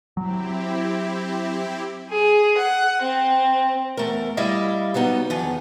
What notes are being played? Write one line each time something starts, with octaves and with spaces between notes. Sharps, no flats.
F#3 C4 E4 G4
G#4
F#5
C4
E2 A3 A#4
G3 E4 D#5 F5
F#3 G3 B3 D#4
E2 D#3 F3